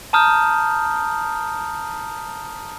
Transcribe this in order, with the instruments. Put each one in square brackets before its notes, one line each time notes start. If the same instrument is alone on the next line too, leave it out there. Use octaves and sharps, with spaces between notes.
[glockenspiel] A5 A#5 D#6 F6 G6